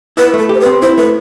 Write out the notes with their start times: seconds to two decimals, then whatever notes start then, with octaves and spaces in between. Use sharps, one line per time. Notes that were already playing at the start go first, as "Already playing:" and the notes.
0.17 E4 B4
0.34 A3 A4
0.49 G4 C5
0.60 B4
0.66 C4
0.82 E4 C5
0.98 A3 B4